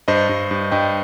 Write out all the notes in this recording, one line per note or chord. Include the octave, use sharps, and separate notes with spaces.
G2 C5 D#5
G2
G2
G2 D#5 G5